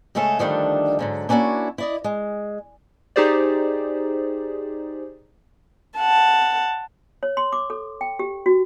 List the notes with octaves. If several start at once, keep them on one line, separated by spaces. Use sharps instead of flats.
C#3 G#3 A3 C#4 A4
D3 D#3 F3 G3 A3 D4
G#2 D3 F#3
A#3 C#4 D4 E4 F#4
E4 D5 D#5
G#3
D#4 G4 G#4 C5 D5
F#5 A5
C#5
C6
D6
A4
G5
G4
F#4